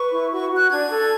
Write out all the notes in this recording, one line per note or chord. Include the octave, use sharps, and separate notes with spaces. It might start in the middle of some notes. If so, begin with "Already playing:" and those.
Already playing: B4 C#6
E4
F#4 C#6
F#4
F#6
D4 G#6
A4